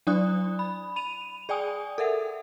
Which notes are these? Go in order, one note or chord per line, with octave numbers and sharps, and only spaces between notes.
F#3 D4 E4 D5 D#6 F#6
B5
B5 D#7 F7
G#4 D5 G5 G#5 D#6
A4 A#4 E5 F#5